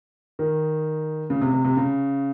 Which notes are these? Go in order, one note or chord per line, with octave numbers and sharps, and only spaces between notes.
D#3
C#3
C3
C3
C3
C#3